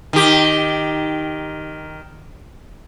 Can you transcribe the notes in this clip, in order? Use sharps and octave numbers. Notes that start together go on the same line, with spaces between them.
D#3 G4